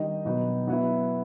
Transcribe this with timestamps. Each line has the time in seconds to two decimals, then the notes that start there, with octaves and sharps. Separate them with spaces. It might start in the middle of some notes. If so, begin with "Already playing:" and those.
Already playing: D#3 G3 D#4 D#5
0.25 B2 F#3 B3 D#4
0.67 F#3 B3 E4